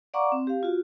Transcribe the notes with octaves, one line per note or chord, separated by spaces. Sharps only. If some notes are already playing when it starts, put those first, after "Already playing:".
D5 F5 F#5 A#5 C#6 D6
C4
G4 F5
F4 F#4